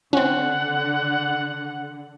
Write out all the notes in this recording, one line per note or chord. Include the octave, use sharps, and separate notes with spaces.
D3 C4 C#4 F#5